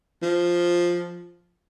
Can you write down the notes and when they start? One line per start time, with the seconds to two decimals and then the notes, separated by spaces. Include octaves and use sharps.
0.23 F3